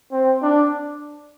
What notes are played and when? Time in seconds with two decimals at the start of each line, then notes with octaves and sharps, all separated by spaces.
0.12 C4
0.42 D4